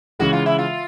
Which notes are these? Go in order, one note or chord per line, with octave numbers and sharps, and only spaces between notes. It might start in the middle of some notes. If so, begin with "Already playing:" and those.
C#3 E3 G#3 F#4
F4
E4
F4